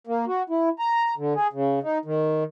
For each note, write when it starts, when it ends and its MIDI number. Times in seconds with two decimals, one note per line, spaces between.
0.07 0.25 58
0.27 0.43 66
0.50 0.69 64
0.79 1.14 82
1.18 1.34 50
1.35 1.47 68
1.53 1.79 49
1.83 1.98 63
2.05 2.44 51